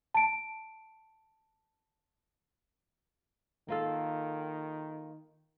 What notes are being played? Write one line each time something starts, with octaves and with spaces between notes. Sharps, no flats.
A5 D7
D#3 A#3 F4 A4